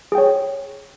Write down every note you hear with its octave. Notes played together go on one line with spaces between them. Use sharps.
G#4 C#5 G5